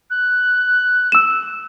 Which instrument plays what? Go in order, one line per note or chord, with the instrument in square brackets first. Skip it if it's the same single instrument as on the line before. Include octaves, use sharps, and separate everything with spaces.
[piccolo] F#6
[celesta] E6 E7